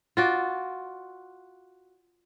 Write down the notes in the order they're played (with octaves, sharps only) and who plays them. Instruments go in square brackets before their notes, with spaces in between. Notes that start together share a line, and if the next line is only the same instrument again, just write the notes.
[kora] F4 F#4 D5